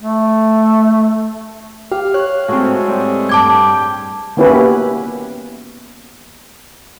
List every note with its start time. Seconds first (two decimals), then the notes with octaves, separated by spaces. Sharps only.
0.02 A3
1.92 G4 F5
2.14 C#5 F#6
2.48 A2 G#3 C4 F#4
2.88 G3 C4
3.29 G2 G5 A5 D6 G#6
4.37 A#3 B3 C#4 E4 G4 B4